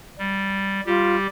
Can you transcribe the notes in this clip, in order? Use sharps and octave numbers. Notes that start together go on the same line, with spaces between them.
G3
G3 F4 G4